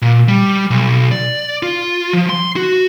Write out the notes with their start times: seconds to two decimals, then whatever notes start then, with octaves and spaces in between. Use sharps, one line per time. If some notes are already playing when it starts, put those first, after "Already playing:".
0.02 A#2
0.28 G3
0.71 B1
1.11 D5
1.63 F4
2.13 F3
2.30 C6
2.56 F#4